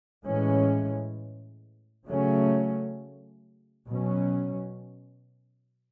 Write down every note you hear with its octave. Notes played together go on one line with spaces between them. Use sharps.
A2 E3 G#3 C#4
C#3 F#3 A3 C#4
B2 F#3 C#4